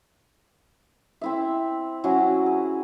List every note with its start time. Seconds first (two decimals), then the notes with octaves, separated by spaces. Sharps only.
1.21 C4 E4 E5
2.04 F#3 C#4 E4 F#4
2.46 G#4